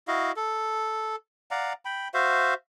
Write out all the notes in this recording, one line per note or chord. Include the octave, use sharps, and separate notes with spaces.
E4 F#4 D#5 F5
A4
D5 F5 F#5 A#5
G5 B5
F#4 C5 E5 F5